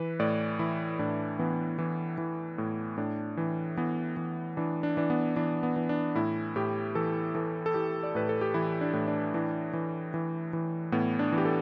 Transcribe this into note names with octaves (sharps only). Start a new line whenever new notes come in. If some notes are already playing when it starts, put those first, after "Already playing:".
Already playing: E3 B4
A2 D5
E3 E4
A2 D4
E3 B3
E3
E3
A2
A2 D4
E3
E3 B3
E3
E3 D4
D4
E3 D4
B3
E3 D4
B3
E3
D4
A2 E4
A2 G4
E3 A4
E3 A4
A4
E3 G4
D5
A2 B4
A4
G4
E3 E4
D4
A2
D4
E3 D4
E3
E3
E3
A2 B3
D4
E3
G4
A4